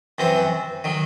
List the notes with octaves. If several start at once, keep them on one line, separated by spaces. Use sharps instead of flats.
F#2 E3 C4 F#4
D#3 F#3